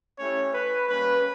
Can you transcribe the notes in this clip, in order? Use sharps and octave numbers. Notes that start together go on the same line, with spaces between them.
A3 C#4 E4 G4 C#5
B4
G3 A#3 C#4 B4